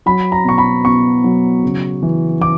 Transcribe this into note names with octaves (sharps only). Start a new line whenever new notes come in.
F#3 B5
A#5
B2 C#6
B5
B2 C#6
F#3
C#3
E3
E3 D6